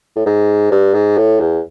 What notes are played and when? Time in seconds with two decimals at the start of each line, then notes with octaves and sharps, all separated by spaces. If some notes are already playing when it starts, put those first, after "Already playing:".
0.16 A2
0.26 G#2
0.72 G2
0.94 G#2
1.17 A2
1.40 E2